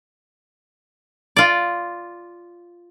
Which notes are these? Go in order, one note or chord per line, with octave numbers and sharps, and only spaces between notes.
F4 D5